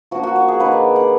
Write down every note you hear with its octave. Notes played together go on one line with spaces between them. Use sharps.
F3 A#3 D4 F#4
F#4
F#4
G#4
D3 F3 A#3 D#4 B4
D5
F#5